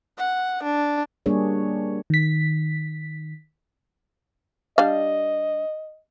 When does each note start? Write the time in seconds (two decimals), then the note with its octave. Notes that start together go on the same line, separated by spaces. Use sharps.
0.18 F#5
0.63 D4
1.26 G3 A#3 D4 G#4 C#5
2.10 D#3 B6
4.78 G3 D4 D#5 F5